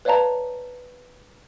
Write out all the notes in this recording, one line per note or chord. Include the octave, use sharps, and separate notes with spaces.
B4 C#5 D5 F5 A5 A#5